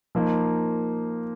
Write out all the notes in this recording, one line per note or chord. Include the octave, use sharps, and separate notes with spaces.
F3 A#3 D#4